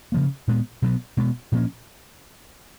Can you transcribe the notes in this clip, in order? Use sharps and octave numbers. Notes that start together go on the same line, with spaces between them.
C#3 F3 A#3
A#2 G#3 B3
B2 F#3 B3
B2 G#3 B3
A#2 F3 A#3 C#4